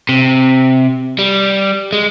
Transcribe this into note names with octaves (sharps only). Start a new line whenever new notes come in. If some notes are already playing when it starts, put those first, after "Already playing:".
C3
G3
G#3